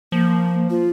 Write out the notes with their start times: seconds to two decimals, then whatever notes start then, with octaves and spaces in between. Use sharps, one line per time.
0.12 F3 A#3
0.70 F4